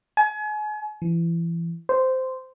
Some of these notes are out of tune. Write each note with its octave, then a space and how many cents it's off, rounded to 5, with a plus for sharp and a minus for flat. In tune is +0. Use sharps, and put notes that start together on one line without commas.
G#5 +35
E3 +30
C5 -10